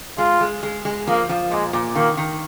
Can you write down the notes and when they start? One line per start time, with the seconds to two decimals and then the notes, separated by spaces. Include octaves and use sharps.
0.18 G#3 F4
0.41 G#3
0.63 G#3
0.85 G#3
1.07 F3 A#3
1.29 F3
1.51 A#2 G#3
1.73 A#2
1.95 D#3 A#3
2.17 D#3